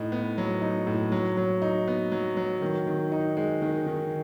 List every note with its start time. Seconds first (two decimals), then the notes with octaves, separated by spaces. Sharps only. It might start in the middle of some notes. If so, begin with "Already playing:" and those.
Already playing: A2 D#4
0.12 B3
0.38 F#3
0.62 D#4
0.87 A2
1.12 F#3
1.37 F#3
1.62 D#4
1.88 B3
2.12 F#3
2.37 F#3
2.62 D#3
2.87 D#3
3.12 D#4
3.37 G#3
3.62 D#3
3.86 D#3